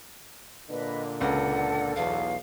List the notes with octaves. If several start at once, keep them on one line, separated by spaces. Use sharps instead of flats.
A#2 D3 D4 B4 D#5
C#2 A4 F#5 A5
B1 E2 F5